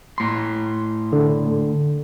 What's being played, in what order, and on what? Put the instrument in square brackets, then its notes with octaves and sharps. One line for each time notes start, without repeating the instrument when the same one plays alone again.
[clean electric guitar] A2 C6
[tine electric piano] D3